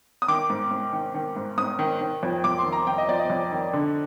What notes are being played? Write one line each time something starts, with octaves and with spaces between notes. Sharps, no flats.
D#6
D#3 D6
G#2
G#2
D#3
D#3
G#2
G#2 D#6
D#3
D#3
F2
F2 D6
C6
D#3
A#5
D#3 G5
D#5
F2 D5
D#5
F2
D#3
D3